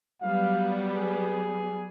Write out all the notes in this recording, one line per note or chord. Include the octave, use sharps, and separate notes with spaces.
F#3 G3 B3 F5
G#4